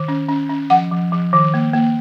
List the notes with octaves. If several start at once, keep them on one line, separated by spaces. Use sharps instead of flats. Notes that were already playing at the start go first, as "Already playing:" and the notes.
Already playing: D#3
C#4
C#4
C#4
F3 F#5
F3
F3
D#3
A#3
A#3